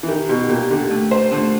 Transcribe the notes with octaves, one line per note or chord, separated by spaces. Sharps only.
E3
D#3 G4
B2 G4
A#2 G4
D3 G4
A3
C5
D3 A3